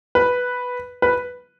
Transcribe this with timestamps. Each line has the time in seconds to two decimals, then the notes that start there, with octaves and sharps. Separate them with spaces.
0.15 B4
1.02 B4